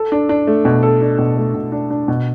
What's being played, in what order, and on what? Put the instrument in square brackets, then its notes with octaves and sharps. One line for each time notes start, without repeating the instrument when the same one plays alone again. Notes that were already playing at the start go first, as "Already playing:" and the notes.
Already playing: [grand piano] A4
D4
D4
A3
B2
A4
D4
B2
A3
B2
D4
D4
B2